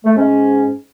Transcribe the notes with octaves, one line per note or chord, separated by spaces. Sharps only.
A3
G#2 C#4